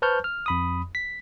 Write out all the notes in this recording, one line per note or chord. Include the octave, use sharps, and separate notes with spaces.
B4 C5 A5 C#6 F6 G6
F6
F2 B5 D#6
B6